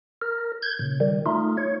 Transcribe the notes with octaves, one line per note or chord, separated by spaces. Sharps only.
A#4
G6 G#6
A#2 C#3
D#3 G3
A3 D#4 F4
C#5